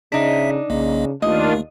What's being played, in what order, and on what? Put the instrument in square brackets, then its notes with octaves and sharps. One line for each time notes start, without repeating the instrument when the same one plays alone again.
[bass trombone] C#3 [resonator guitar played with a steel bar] D4 D#4 [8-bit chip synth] E5 B6
[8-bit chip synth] B1 A#3 D#5 [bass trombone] C#3
[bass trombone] D#2 [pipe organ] D#3 D4 F4 [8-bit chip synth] A3 [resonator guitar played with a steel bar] D#5